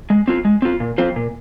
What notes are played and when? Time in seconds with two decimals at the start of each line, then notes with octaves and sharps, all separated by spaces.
0.10 G#3
0.28 C4 F4
0.45 G#3
0.62 C4 F4
0.80 A#2
0.98 F3 C4 F4 C5
1.16 A#2